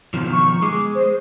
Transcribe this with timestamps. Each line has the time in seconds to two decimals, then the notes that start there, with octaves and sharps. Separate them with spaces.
0.14 B2 D#3 F3
0.33 C#6
0.62 G#3 D6
0.95 C5